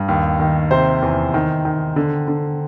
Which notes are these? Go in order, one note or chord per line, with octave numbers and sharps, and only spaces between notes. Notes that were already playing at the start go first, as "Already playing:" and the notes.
Already playing: G2
D#2
D#3
C3 C5
E2
D#3
D#3
D3
D3